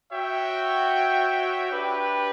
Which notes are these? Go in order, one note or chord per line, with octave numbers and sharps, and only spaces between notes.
F#4 C#5 E5 G5
D4 G4 B4